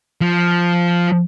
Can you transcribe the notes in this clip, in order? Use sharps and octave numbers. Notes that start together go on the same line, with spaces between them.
F3